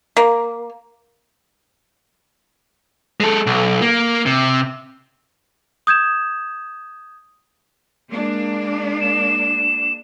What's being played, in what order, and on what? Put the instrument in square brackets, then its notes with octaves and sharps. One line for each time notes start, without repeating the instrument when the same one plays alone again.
[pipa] A#3
[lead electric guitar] G#3 A4
B1
A#3
C3
[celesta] D#6 G6 G#6 E7
[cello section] G#3 A#3 D4
[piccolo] E7